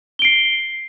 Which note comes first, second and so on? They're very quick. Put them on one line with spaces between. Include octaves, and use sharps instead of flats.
G7 D7 C7